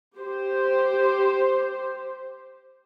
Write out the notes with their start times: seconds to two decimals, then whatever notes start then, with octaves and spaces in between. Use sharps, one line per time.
0.17 G4 C5